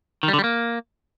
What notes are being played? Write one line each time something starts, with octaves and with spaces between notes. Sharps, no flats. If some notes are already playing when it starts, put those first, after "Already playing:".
D#3
G3
D3
G3
A#3